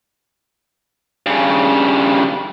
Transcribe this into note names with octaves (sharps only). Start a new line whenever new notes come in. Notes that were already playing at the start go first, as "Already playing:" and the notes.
G2 C#3